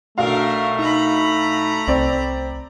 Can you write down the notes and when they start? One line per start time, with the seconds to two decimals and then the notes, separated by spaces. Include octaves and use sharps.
0.18 B1 A3 D4 F#4 A#4 F5
0.79 D#4 A#5 B5
1.88 C2 C4 D5